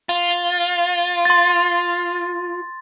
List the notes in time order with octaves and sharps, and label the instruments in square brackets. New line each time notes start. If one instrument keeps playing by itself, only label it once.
[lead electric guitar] F4
[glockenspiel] C6 A6